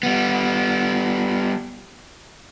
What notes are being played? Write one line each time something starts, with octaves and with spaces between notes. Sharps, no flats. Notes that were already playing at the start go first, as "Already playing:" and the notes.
G3 B3